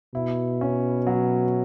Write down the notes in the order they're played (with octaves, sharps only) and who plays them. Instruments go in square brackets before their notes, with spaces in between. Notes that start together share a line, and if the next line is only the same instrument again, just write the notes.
[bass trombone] B2 [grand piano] E4
[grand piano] C#4
F#3